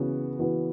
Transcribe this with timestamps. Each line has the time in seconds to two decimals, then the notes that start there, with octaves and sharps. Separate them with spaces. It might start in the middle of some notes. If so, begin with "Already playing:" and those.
Already playing: C#3 E3 B3 F#4
0.39 E3 B3 F#4 B4